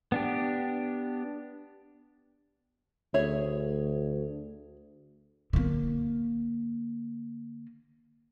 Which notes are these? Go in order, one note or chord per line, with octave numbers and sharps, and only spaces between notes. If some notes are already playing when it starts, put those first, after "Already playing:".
B3 D4 G4
D2 G#4 C#5 E5
D3 A#3